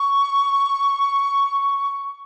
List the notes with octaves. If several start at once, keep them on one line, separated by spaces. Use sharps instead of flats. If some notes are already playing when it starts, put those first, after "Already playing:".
Already playing: C#6